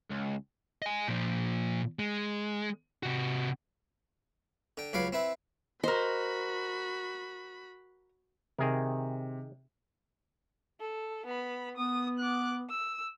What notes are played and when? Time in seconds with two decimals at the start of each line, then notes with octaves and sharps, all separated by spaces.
0.10 C#2
0.82 D#5 G#5
1.08 A#2 F3
1.99 G#3
3.03 C3 F#4
4.77 D3 G5
4.93 C#2 F#3 B4 F5 D6
5.13 C4 E4 B4
5.84 F#4 A#4 C5 D#5 B5
8.58 C3 D#3 G#4 A#4
10.81 A4
11.26 B3 B5
11.77 B3 D#6
12.19 D6 F#6
12.69 E6